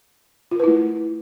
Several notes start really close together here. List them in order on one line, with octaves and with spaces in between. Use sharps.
F4 A#4 B4 E4 A3